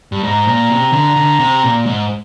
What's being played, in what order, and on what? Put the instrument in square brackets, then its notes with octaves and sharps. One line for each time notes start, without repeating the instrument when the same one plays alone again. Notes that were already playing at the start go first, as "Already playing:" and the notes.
[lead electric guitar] G2
[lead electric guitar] G#2 [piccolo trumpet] A#5
[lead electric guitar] A#2
C3
D3
D3
C3
A#2
G#2